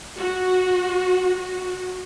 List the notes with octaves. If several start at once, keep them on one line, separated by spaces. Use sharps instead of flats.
F#4
F#4